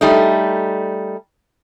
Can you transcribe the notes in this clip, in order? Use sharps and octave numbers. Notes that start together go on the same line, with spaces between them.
G3 A3 D#4